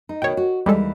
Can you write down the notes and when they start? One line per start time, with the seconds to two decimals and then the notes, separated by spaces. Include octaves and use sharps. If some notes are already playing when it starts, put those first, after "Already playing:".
0.09 D#4
0.22 B2 D#3 C#5 G5
0.37 F#4
0.66 D#2 E3 G3 G#3 A4